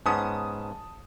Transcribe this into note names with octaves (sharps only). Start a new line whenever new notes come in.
G#2 B3 C#4 A5 D#6